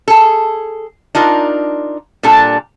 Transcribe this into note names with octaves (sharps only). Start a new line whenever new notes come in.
G#4 A4
D4 D#4 F4 A#4
A#2 G3 D4 A4